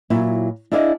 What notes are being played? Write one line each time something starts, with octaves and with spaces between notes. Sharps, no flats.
A#2 F#3 E4
D4 E4 G#4 D5 D#5 F5